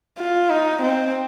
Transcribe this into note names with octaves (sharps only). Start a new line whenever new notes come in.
F4
D#4
C4